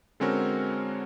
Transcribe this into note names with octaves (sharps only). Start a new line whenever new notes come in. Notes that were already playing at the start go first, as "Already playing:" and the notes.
D3 G#3 C4 C#4 F#4 A#4